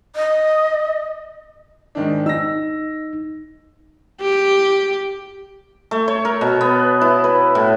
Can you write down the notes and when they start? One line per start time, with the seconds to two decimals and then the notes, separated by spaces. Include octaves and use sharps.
0.16 D#5
1.95 G#2 D#3 D4
2.26 D#4 E6 A#6
4.21 G4
5.91 A3
6.08 C#5
6.25 A#4
6.41 B2
6.61 B3
7.01 E4
7.24 B4
7.55 A2